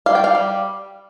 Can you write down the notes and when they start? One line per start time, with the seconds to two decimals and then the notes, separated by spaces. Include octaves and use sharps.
0.06 G3 F5
0.15 G5
0.24 F5
0.35 G3